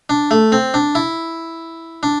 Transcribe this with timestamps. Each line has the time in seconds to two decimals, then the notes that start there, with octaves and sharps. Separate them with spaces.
0.10 D4
0.31 A3
0.52 C4
0.74 D4
0.95 E4
2.03 D4